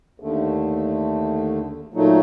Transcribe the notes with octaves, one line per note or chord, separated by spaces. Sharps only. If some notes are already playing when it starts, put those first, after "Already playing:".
D#2 D3 A3
A#2 F#3 A3 D#4